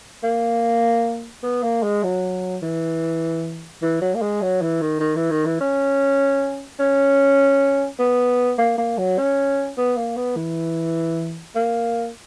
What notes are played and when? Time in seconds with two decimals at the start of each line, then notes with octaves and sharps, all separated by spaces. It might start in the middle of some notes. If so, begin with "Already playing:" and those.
0.24 A#3
1.43 B3
1.63 A#3
1.83 G#3
2.04 F#3
2.62 E3
3.82 E3
4.02 F#3
4.15 A#3
4.22 G#3
4.42 F#3
4.62 E3
4.82 D#3
5.00 D#3
5.16 E3
5.31 D#3
5.46 E3
5.61 C#4
6.80 C#4
7.99 B3
8.58 A#3
8.78 A#3
8.98 F#3
9.18 C#4
9.78 B3
9.97 A#3
10.17 B3
10.36 E3
11.56 A#3